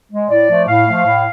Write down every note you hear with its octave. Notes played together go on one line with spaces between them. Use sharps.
G#3
A2 D5
F3 A3
A2 F5
F3 A3
A2